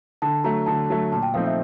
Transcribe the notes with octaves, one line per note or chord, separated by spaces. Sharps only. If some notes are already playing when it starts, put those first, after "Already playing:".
D3 A5
F#3 A3 A#5
D3 A5
F#3 A3
A#2 A5
G5
F3 A3 C4 D#4 F5
E5